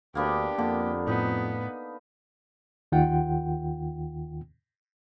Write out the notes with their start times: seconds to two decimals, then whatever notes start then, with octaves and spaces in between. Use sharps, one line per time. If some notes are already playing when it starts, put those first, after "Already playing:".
0.15 D2 A#3 B3 D4 G4
0.58 F2 D3 A#3
1.07 A2 B3 D#4
2.92 D#2 D#3 F4 F#5 G5